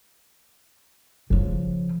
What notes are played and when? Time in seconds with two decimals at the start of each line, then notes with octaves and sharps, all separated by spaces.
1.30 C#3 F3